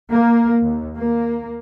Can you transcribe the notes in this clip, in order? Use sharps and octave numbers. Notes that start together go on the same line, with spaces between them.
A#3
D#2
A#3